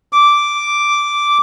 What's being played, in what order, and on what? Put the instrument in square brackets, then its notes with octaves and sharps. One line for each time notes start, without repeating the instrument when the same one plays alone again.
[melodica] D6